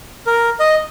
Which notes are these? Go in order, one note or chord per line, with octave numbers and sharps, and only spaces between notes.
A#4
D#5